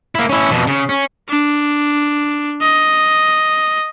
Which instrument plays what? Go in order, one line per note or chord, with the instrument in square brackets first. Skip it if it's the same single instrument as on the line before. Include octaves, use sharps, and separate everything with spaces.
[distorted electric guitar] A#3 E4
C#4 E4
F2 B2
C#3
C#4
[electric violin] D4
D#5